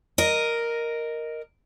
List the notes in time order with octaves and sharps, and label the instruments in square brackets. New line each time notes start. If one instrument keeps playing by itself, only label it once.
[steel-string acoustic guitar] A#4 D#5